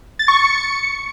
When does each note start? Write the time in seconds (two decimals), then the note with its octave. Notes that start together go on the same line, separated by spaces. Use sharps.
0.19 A6
0.28 C#6
0.37 C#7